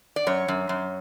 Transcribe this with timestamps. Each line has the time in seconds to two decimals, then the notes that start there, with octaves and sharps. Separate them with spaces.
0.16 D5
0.27 F#2 C#5
0.48 F#2
0.69 F#2